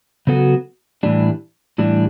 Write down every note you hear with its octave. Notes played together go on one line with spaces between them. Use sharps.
C#3 F#3 B3 F#4 A4
A2 E3 G3 D4
A2 E3 G3 D4